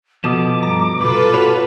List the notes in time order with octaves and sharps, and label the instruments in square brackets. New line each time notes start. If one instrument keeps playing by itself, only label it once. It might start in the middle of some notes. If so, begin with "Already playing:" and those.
[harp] B2 [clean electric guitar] F3 A4 D#5 [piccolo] D6
[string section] G2 [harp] A#5
[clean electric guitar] B1 B2 [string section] F4 A4 B4
[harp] F#4 [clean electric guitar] C#5 B5